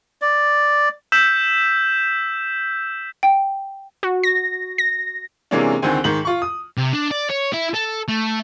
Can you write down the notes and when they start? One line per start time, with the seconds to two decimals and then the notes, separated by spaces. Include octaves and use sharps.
0.22 D5
1.12 E6 G6 B6 E7
3.23 G5
4.03 F#4
4.23 A#6
4.78 A#6
5.51 C3 E3 G#3 A#3 C#4 D4
5.82 C#2 D3 D#3 C4 G#5
6.04 G#2 D#3 F#7
6.25 F4 C#6
6.42 D#6
6.77 C3
6.93 D4
7.11 D5
7.30 C#5
7.53 E4
7.75 A4
8.08 A3